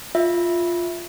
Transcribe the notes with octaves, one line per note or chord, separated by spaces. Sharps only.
F4 E5